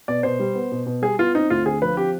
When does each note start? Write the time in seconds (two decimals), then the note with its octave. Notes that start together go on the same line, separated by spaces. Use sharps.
0.08 B2 D5
0.23 B2 C5
0.40 G3
0.55 B3
0.72 B2
0.86 B2
1.02 G3 G#4
1.19 B3 F4
1.35 C4 D#4
1.50 D2 F4
1.66 D3 G#4
1.82 F3 B4
1.97 C4 G4